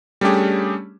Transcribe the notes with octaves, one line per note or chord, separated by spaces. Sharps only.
G3 A3 C#4 D4 G4 G#4